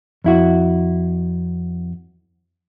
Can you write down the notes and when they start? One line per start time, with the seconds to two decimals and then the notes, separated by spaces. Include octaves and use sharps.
0.24 F2 E4 F#4